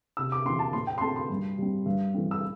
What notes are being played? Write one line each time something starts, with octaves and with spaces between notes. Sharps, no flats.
C3 E6
D6
E3 C4 C6
A5
A2 C6
G5
C6
A3 C4 A5
C6
G2
G3 C4
G2
E3 A3 C4
E6